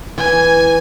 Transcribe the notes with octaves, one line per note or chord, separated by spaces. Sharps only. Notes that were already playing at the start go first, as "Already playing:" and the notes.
E3 G#5